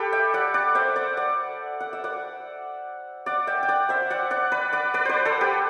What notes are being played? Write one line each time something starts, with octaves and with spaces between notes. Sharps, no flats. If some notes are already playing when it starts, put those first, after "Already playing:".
Already playing: G4 A4 B4
E5 G5
D5 F#5
D5 F#5
C5 E5
D5 F#5
D5 F#5
F#5
E5
D5 F#5
D5 F#5
E5 G5
G5
D5 F#5
C5 E5
D5 F#5
D5 F#5
B4 D5
D5 F#5
B4 D5
B4 C5 D5
A4 C5
G4 B4